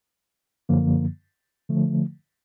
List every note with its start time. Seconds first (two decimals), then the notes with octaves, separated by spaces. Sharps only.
0.69 F#2 D3 F3 A#3
1.69 D3 F3 A3